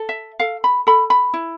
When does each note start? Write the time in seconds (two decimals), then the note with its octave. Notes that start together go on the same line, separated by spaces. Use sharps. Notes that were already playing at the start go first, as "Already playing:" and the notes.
Already playing: A4
0.09 E5
0.39 A4 F5
0.64 B5
0.87 A4 B5
1.10 B5
1.34 E4